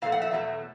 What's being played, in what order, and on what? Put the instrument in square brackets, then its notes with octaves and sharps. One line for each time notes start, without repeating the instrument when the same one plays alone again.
[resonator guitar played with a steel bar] A#2 F3 A3 F5
F#5
E5
E2 B2 F#3 A3